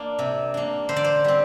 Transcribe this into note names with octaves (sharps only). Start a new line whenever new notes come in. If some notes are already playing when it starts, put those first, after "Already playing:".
Already playing: A#3 D4
C3
A#3 D4
D3 C5
D5
C5
G3 C4